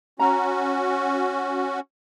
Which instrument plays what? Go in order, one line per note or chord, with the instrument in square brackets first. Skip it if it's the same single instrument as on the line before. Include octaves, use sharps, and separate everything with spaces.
[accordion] C#4 F#4 [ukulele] A#5